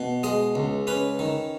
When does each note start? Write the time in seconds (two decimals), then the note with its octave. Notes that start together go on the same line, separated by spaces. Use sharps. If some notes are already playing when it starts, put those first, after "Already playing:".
Already playing: B2
0.23 G#3 D#5
0.55 C#2
0.87 C#4 B4
1.19 D#3